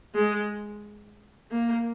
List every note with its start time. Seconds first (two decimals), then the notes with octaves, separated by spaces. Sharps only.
0.15 G#3
1.51 A#3